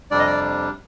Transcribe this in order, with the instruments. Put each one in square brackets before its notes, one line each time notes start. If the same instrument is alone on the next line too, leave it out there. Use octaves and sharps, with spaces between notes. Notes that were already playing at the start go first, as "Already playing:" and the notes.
[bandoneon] F2 C3 G3 D4 D5
D#5
D5